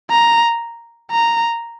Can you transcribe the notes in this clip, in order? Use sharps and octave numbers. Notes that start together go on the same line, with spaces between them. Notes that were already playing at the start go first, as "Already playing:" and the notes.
A#5
A#5